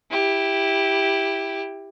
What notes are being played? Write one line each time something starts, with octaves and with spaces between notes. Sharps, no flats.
E4 G4